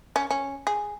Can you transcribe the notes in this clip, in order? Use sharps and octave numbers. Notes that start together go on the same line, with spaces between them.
C#4
C#4
G#4